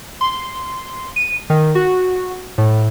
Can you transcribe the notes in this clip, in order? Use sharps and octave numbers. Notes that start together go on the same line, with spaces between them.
C6
D#7
D#3
F#4
A2